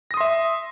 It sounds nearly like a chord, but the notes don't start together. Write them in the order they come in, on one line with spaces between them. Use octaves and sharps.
A#6 D#6 C6 E5